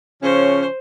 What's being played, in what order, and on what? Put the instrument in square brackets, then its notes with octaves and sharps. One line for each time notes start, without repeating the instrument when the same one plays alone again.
[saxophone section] C#3 F3 C#4 [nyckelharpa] C5